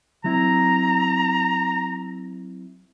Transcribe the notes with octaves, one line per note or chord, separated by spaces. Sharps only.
F#3 C4 E4 A#5